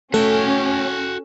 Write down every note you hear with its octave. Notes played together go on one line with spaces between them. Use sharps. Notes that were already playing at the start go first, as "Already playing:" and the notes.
A3 C#4 F#4 A4 G5